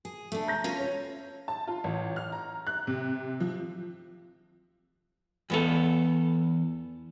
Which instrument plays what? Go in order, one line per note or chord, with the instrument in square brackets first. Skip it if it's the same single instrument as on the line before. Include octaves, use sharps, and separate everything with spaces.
[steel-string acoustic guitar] G#4
A3 D4
[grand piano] A#5 G6 A#6
[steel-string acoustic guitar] C#4 F4 B4
[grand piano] C#5
[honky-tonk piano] A5
F4
A1
F6
A#5
F#6
C3
F3
[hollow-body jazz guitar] E2 B3 A4